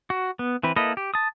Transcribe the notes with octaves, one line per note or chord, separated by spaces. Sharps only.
F#4
B3
E3 C4 B4
A#3 E4 A4 B4 D#5
G4
A5 D#6